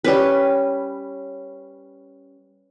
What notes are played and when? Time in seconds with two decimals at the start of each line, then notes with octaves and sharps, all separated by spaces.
0.04 G3 C#4 B4